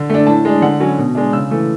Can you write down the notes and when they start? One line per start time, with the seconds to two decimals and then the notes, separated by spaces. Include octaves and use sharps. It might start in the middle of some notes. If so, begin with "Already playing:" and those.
Already playing: D3
0.10 A3 D4
0.27 A2 A5
0.45 G#3 D4
0.62 D3 F#5
0.80 F#3 C#4
0.98 B2
1.15 G#3 D4
1.33 C#3 E6
1.51 E3 A3